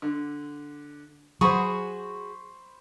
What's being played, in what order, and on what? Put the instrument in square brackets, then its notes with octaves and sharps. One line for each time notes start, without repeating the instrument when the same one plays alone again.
[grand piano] D3
[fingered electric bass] F#3 [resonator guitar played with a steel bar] F#4 G#4 [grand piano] C5 B5 C#6